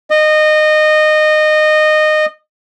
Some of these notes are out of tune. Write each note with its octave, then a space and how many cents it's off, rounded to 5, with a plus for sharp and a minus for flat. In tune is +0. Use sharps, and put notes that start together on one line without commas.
D#5 -20